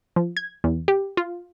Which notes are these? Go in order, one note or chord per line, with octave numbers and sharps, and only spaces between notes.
F3
G#6
E2
G4
F4